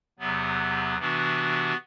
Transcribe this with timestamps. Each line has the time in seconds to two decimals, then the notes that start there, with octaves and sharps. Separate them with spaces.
0.19 E2 C3 F#3 B3
0.98 C3 E3 B3 D4 F#4